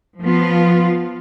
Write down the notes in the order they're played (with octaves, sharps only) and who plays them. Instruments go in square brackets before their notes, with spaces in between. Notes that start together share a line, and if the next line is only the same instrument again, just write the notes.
[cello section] F3 B3 F4